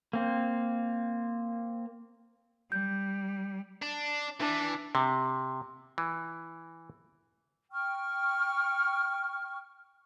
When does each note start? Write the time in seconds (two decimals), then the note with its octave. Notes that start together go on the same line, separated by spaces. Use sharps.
0.13 A#3 C4
2.72 G3 G6
3.82 D4
4.40 E3 D4
4.95 C3
5.98 E3
7.72 G5 C#6 F6